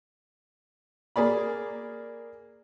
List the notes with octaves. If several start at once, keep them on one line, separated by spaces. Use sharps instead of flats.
A#3 G#4 D5 B5